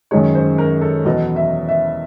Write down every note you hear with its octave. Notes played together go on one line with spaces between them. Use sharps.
F#2 D#3 G#3 C#5
C5
A#4
A4
E2 B2 F#3 D#5
E5
E5